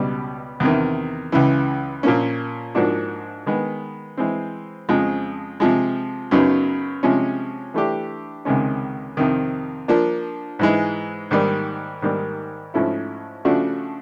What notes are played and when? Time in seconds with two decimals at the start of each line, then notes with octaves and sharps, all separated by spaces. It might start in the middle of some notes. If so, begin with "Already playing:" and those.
Already playing: C#2 B2 G3
0.60 E2 C3 D#3
1.32 C#2 C#3 E3
2.03 A#2 F3 A#3 C#4
2.75 G#2 F3 A#3 D4 F#4
3.46 D#3 G#3 B3
4.17 E3 G#3 C4
4.89 F2 C#3 F3 G#3
5.60 C3 F3 G#3
6.31 F#2 C#3 F#3 B3 D#4
7.03 C3 F3 G#3 C#4
7.74 E3 A3 D4 G4
8.45 C#2 C3 D#3 G#3 C#4
9.17 F2 C3 D#3
9.88 F3 A#3 D4
10.59 G#2 E3 G#3
11.31 G#2 D#3 G3 A#3
12.02 G#2 D#3 G3 A#3
12.74 G#2 F3 A3 C#4 E4
13.45 C#3 F3 A3 D4 F#4